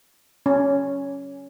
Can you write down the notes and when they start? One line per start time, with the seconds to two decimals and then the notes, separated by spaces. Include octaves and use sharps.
0.46 C#4